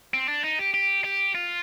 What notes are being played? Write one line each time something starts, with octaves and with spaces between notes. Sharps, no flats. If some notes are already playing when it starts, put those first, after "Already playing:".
C4
D4
D#4
G4
G4
G4
F4